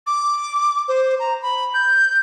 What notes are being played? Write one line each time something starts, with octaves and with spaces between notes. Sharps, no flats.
D6
C5
A#5
B5
G6